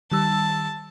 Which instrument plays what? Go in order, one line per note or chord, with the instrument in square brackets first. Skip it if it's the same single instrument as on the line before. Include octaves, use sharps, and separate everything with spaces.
[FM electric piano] D#3 G3 E6 [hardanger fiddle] A5